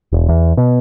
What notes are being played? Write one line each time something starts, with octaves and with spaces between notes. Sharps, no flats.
E1
E2
B2